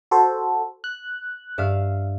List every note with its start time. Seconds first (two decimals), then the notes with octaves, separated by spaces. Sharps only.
0.11 F#4 A4 C5
0.84 F#6
1.58 G2 E5 F5